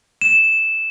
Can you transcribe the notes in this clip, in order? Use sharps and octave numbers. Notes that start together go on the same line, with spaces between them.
E7